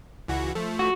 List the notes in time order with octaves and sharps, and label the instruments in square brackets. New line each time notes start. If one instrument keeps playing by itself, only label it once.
[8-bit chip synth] C#2 E3 F#4
F3 A3
[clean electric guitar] F#4